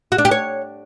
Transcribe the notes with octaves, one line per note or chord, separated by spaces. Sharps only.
F#4
D4
G4
C#5